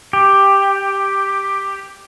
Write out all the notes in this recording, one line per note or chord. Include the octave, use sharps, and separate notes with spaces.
G4